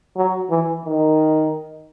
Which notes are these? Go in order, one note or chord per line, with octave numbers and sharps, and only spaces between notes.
F#3
E3
D#3